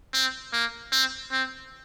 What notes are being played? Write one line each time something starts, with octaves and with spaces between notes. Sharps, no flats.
C4
A#3
C4
C4